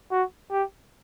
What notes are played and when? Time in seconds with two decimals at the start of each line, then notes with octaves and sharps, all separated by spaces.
0.11 F#4
0.51 G4